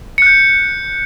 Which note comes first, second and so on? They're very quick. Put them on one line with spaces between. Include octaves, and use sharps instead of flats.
C#7 F#6 G6